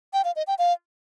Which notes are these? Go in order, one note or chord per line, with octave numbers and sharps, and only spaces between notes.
G5
F5
D#5
G5
F5